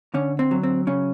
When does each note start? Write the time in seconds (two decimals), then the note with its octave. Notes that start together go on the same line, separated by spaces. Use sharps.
0.14 D3 C#4
0.39 C4
0.51 F#3
0.63 C4
0.87 C#3 C#4